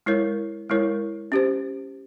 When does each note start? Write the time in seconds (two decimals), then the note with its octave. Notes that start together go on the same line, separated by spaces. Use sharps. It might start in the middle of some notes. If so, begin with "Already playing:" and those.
0.06 G#3 E4 A#4 C#5
0.69 G#3 E4 A#4 C#5
1.32 C#4 G4 C5